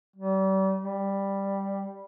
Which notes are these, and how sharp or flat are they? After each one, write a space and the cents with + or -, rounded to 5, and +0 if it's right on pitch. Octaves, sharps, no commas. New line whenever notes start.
G3 -35
G3 +5